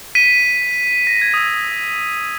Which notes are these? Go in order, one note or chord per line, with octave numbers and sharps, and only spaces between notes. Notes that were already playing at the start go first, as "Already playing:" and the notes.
B6 D#7
A#6
G#6
D#6
E6